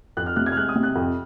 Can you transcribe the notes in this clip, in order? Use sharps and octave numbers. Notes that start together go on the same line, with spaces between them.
F2 F#6
F6
C3 F#6
G#6
F6
G#3 F#6
D#6
C3
F#6
F2